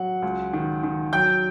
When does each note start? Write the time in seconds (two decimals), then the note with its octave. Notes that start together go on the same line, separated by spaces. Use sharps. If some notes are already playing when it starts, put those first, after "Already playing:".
Already playing: F#3 F#5
0.22 C#2
0.53 D#3
0.83 D#3
1.13 F#3 G5 G6